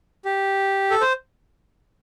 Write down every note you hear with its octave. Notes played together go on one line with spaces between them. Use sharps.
G4
A4
C5